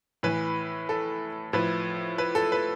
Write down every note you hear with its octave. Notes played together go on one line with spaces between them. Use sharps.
A2 E3 B4
A4
A2 F3 B4
B4
A4
B4